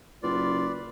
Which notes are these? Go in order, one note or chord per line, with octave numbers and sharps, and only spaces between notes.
F#1 F4 B4 D5